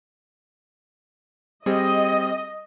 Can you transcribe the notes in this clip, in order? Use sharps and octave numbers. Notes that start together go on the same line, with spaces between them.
G3 C4 G#4 D#5